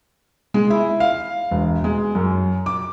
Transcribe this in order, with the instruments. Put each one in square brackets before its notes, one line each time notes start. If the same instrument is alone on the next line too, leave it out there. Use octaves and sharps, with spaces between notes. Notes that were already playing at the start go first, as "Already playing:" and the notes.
[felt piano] G#3
E4
F5
E1
G#3
F#2
D6